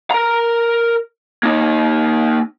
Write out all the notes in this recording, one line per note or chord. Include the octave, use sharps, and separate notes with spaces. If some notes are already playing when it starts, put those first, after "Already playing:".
A#4 A#5
A#3 D#4